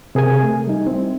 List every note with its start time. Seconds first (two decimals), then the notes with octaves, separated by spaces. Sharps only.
0.15 C3 G#4 A#4 G#5
0.43 A3
0.67 G3 D#4
0.87 C4 E4